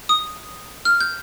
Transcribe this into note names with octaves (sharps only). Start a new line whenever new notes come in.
D#6
F6
G6